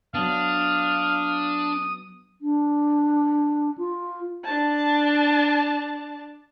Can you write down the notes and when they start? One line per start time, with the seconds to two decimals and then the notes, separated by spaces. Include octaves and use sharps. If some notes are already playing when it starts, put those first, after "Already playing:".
0.14 F#3 B3 D4 F5 D#6
2.41 D4
3.78 F4
4.44 D4 A5